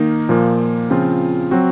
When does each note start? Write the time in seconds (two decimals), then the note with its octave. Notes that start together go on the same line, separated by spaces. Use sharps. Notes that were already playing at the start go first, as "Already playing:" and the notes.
Already playing: D#3 A#3 D#4
0.29 A#2 F3 A#3
0.90 C#3 F3 C4 F4
1.51 F#3 C4 F#4